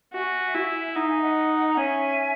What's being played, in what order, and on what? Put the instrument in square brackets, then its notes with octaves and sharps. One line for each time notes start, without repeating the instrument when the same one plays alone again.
[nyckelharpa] F#4 [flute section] E5 G#5
[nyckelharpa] E4
[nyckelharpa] D#4 [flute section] F#5 A#5
[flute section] E5 G#5
D#5 F#5
A#5
[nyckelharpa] C#4 [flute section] E5 G#5